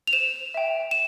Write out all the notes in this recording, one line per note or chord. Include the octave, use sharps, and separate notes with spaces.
F7
C5 E7
E5 G5
E7